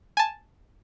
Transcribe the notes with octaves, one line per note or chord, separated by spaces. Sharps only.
G#5 A5